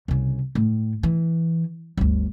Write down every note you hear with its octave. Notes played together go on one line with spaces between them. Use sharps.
C2 C#3
A2
E3
G1 D2